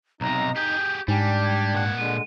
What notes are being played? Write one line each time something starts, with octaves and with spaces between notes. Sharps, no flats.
B1 C3 D#4 A#5
G4 G#4 G6
G#2 G3 D4 G4 G#5
G#6
A#2 F#5
D3 G#3 D#7